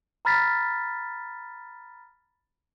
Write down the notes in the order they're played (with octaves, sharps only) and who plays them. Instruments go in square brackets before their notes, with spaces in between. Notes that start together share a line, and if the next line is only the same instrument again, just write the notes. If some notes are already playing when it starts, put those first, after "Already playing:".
[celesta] A#5 B5 F6 A6 B6